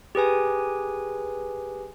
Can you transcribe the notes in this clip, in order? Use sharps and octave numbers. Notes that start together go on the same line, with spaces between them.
G4 G#4 B4 G#5